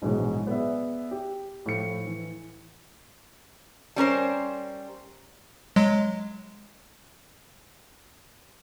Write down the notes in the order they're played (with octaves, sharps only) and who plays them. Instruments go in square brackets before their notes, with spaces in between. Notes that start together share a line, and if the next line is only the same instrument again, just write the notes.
[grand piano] A#1 G#2 B2 E3 F#3 G#3
B3 G#4 D5 E5
G4
A2 F3 C#7
E3
[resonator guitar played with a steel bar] G3 C#4 A#4 C5
[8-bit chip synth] F#3 G#3